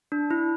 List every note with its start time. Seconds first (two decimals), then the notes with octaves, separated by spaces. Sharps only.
0.12 D4
0.31 E4